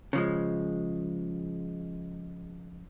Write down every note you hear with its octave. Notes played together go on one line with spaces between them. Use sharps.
C#3 F3 G#3